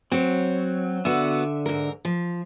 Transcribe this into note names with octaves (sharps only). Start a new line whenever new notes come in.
F#3 C4 C#5
D3 B3 F#4 E5
G#2 A#4
F3